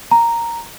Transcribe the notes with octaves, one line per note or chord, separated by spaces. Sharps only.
A#5